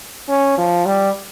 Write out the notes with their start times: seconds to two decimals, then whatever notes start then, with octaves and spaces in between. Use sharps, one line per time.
0.29 C#4
0.58 F3
0.86 G3